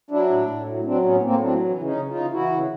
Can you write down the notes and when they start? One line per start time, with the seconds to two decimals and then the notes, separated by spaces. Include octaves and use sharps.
0.11 F#3 D4 E4
0.29 A2
0.47 A2
0.66 F#3
0.84 F#3 C4 D4
1.03 A2 B3 C#4
1.22 A2 A#3 C4
1.40 F#3 C4 D4
1.59 E3
1.77 C#3
1.83 C#4 D#4
1.96 C#3
2.09 D#4 F4
2.14 E3
2.33 E3 E4 F#4
2.52 C#3